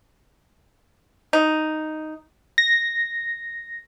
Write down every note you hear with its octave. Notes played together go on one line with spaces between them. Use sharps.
D#4
A#6